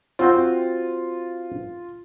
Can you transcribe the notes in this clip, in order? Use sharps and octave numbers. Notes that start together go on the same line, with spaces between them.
C4 F4 F#4 G5